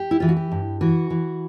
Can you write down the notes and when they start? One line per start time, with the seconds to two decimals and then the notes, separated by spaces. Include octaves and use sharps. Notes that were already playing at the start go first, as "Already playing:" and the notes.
Already playing: G4
0.11 E4
0.20 E3 F4
0.29 F#4
0.37 G4
0.52 G2
0.81 E3 F#4
1.10 E3